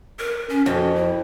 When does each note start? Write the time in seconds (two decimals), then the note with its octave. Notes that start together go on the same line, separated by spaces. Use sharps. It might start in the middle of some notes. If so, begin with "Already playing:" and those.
0.19 A#4
0.49 C#4
0.66 F2 F#4
0.95 E4